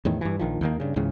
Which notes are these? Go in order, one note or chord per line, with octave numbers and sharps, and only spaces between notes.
E2 A2 D#3
G2 E3
A#1 D#3 F3
D#2 D#3 A#3
G2 C#3
C#2 G#2 C#3 E3